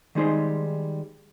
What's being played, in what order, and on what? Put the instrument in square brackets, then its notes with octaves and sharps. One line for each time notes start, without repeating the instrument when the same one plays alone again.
[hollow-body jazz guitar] D#3 G3 G#3 D#4 G#4 C5